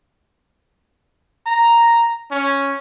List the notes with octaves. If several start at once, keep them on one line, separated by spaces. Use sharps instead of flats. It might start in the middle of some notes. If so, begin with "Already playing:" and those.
A#5
C#4